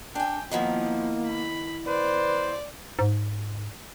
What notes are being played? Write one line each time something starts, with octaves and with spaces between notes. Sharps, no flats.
D4 G5 G#5
D#3 F3 A#3 B3 E4
B5
B4 C5 D5
G#2